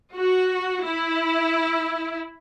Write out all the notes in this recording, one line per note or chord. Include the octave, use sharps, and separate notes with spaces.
F#4
E4